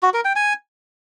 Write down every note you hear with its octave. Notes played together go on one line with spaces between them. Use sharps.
F#4
A#4
G5
G#5